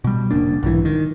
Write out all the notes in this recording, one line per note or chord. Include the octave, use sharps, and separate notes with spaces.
B2 G3
F1 C#3 A#3 D4
B1 G#2 E3
D#3